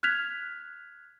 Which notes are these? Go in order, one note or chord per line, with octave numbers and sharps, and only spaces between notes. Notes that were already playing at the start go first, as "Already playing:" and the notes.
F6 F#6 G#6 B6 F7